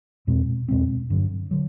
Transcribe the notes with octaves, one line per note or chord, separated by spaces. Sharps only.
E2 B2 G#3 C4
E2 B2 G#3 C4
G2 D3 F#3
D3 F#3